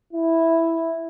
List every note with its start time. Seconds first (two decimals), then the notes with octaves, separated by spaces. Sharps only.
0.13 E4